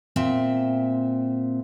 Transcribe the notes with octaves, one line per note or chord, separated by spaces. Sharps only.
A#2 C4 E5